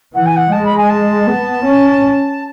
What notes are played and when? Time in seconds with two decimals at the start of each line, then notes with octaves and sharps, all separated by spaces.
0.14 E3 F#5
0.26 G#5
0.36 F#5
0.52 G#3 A5
0.65 B5
0.77 G#5
0.89 A5
1.27 B3
1.65 C#4